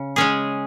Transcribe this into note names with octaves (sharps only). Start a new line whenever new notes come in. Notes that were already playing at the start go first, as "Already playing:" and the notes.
Already playing: C#3
G#3 C#4 G#4